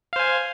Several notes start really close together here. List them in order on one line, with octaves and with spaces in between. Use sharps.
F5 C5 G#5